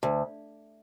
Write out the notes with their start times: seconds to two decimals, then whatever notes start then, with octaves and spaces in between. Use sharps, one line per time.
0.03 D2